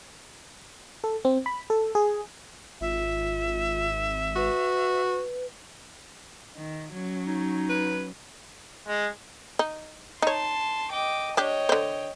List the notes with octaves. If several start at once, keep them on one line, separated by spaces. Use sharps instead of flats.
A4
C4
B5
A4
G#4
G#1 F4 E5
F#4 B4
D#3
F#3 C#4
D#4
B4
G#3
D#4
D#4 C#5 A5 C6
D#5 G5 D6
D4 G4 C#5 D#5 G5
D3 C5